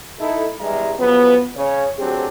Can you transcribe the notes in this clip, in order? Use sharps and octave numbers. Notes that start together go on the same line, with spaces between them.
D#4 E4 A4
E2 G2 G3 G#3 E5 A#5
C#3 F3 F#3 B3
C#3 C#5
D2 F#3 C4 D4 G4 G#4